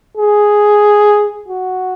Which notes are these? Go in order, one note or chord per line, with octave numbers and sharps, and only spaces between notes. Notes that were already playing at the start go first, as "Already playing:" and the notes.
G#4
F#4